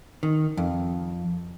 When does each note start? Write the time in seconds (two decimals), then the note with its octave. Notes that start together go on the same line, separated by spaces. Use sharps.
0.23 D#3
0.57 F2